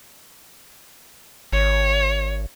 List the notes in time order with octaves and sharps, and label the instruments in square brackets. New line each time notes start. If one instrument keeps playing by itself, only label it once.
[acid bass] G#1 [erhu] C#5